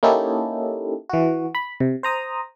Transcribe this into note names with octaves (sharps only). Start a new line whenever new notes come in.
A#3 C#4 D#4 E4 G4 A4
E3 F#4
B5
C3
C5 A#5 D#6